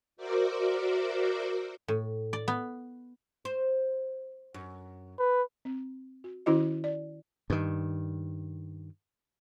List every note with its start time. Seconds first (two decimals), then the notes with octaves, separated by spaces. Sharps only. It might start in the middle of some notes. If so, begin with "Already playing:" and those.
0.17 F#4 A#4 C5 D5 E5 D6
1.88 A2
2.33 D5
2.48 B3
3.45 C5
4.54 F#2
5.19 B4
5.65 C4
6.24 F#4
6.46 D#3 C#4 E4 F#4 D#5
6.84 D5
7.50 G2 D#3